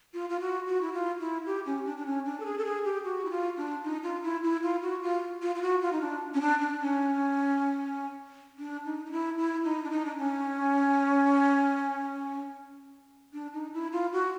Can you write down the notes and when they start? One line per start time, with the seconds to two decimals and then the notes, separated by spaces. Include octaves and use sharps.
0.14 F4
0.29 F4
0.41 F#4
0.67 F#4
0.81 E4
0.93 F4
1.19 E4
1.46 G4
1.66 C#4
1.85 D4
1.97 D4
2.06 C#4
2.26 D4
2.40 A4
2.45 G#4
2.58 A4
2.65 G#4
2.85 G4
3.04 F#4
3.25 E4
3.30 F4
3.57 D4
3.83 D#4
4.03 F4
4.23 E4
4.43 E4
4.63 F4
4.83 F#4
5.02 F4
5.42 F4
5.55 F4
5.62 F#4
5.82 F4
5.92 D#4
6.01 D4
6.34 C#4
6.41 D4
6.61 D4
6.81 C#4
8.59 D4
8.85 D#4
9.06 D#4
9.12 E4
9.38 E4
9.64 D#4
9.84 D4
9.91 D#4
10.05 D4
10.17 C#4
13.33 D4
13.53 D#4
13.74 E4
13.93 F4
14.13 F#4